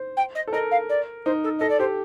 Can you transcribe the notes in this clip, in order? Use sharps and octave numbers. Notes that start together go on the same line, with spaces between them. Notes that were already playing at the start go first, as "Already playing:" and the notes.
Already playing: C5
G5
D#5
A4
A#4 D#5
F5
D5
D#4 C5
A4
A4 D#5
D5
G4 C5